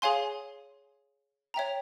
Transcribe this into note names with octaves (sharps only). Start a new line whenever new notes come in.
G#4 C#5 F5 G#5 C6
C#5 E5 G5 A#5